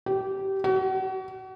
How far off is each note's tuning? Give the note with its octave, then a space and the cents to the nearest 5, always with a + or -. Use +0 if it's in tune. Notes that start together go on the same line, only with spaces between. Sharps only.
G4 -20
F#4 +35